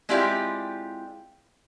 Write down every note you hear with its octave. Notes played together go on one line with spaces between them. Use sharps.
G#3 C4 E4 F4 G4 D5